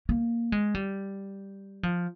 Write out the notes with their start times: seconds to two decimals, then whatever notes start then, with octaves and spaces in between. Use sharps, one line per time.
0.09 A#3
0.52 G#3
0.75 G3
1.83 F3